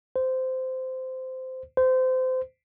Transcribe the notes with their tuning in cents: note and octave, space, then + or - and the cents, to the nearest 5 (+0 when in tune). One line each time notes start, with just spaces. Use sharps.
C5 -15
C5 -25